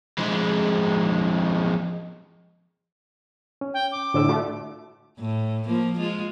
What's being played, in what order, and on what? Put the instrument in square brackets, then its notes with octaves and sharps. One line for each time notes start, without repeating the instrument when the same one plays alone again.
[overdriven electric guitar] F2 G#3
[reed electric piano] C#4
[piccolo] G5
D6
[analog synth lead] A2 [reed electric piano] D3 D4 E6
[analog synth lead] A3 [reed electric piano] F4 F#4 D5
[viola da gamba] A2
F3 A#3
G#3 F4